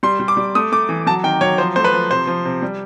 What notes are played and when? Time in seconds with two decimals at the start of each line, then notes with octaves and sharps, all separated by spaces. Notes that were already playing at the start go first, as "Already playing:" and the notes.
0.03 G3 C6
0.20 G3
0.28 D6
0.37 G3
0.55 A3 D#6
0.72 A3 D6
0.89 E3
1.06 F#3 A5
1.24 D#3 G5
1.41 F#3 C#5
1.58 F3 C5
1.76 A3 C5
1.84 B4
1.93 F3
2.11 C3 C5
2.27 F3
2.45 C3
2.62 G3